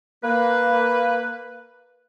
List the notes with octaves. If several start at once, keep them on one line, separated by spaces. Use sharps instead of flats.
A#3 B4